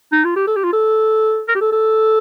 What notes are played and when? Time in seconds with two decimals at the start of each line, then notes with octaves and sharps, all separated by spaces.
0.12 D#4
0.24 F4
0.36 G4
0.47 A4
0.56 G4
0.64 F4
0.73 A4
1.48 A#4
1.55 G4
1.61 A4
1.72 A4